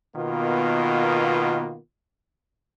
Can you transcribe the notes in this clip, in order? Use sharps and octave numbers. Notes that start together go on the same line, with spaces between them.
B2 D#3 A#3 B3 F4